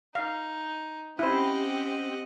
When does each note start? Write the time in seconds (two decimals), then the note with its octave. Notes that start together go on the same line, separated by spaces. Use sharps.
0.15 D#4 F5
1.19 C4 C#4 E4 G4 C5 D#5 F#5